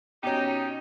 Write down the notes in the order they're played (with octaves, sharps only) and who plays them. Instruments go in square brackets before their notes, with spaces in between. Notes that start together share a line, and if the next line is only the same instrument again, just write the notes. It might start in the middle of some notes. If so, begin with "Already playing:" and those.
[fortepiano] B2 C#4 [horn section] D#4 G4